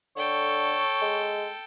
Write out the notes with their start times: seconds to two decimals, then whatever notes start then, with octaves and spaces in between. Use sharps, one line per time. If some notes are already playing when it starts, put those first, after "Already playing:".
0.17 D3 A4 C#5 G5
1.02 G#3